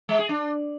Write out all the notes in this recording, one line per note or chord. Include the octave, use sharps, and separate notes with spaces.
G#3
G#4
D4